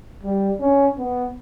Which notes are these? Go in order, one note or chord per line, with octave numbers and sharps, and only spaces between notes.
G3
C#4
B3